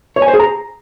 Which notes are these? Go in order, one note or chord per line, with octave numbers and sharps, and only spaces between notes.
C#5
G#5
C5
G#4
A#5